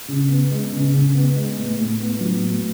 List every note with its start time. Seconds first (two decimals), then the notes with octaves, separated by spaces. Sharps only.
0.08 C#3
0.29 B3
0.51 G#3
0.72 C#3
0.93 C#3
1.15 B3
1.36 G#3
1.58 A2
1.79 A2
2.00 B3
2.21 F#3
2.43 A2